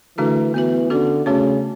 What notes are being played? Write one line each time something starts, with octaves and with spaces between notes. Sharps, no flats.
D3 E3 A3 D4 F#4 A4
E3 B3 F#4 B4
D3 C#4 F#4 A4
C#3 A3 C#4 F#4 C#5